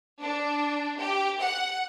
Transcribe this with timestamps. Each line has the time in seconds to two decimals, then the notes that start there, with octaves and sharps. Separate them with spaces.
0.22 D4
0.98 G4
1.40 F#5